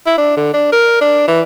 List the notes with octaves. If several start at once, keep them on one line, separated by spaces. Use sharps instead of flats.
E4
D4
D3
D4
A#4
D4
E3